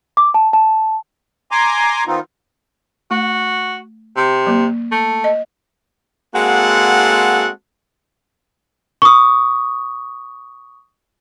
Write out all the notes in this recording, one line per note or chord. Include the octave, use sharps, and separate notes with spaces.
D6
A5
A5
G#5 A#5 C6 D6
D#3 B3 C4 D#4 F4
A3 F#4
C3
F#3 A#3
A3
D#5
G#3 A#3 C4 F#4 A4 F#5
C#6 D#6